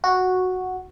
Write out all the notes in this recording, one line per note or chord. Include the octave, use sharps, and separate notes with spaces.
F#4